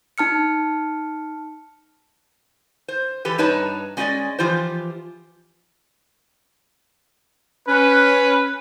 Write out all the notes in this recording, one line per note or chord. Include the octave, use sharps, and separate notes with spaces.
D#4 A5 F6 C#7
C5
E3 G4 A4 B4
G2 D#4 B4 C#5 A5 A#5
G#3 C#4 F4 G4 D5 D#5
E3 F3 F4 G4 C5
C#4 B4